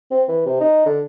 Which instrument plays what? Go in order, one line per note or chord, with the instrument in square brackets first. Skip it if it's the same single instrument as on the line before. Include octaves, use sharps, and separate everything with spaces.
[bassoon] C4
E3
C3
D#4
D3